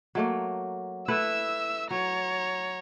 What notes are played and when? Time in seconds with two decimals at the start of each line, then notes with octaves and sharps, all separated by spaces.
0.15 F#3 A3 A#3
1.08 A3 E4 B4 E5 E6
1.91 F#3 C#5 A#5